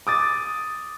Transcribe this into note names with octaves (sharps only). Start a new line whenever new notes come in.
D6 D#6 A6